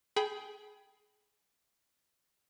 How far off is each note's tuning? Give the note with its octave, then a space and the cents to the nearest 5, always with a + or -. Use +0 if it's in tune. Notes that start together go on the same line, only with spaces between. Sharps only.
G#4 +20 G5 +0 B5 +0